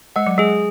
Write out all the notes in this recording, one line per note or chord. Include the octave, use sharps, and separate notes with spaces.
G#3 F#5
F#3
G#3 G#4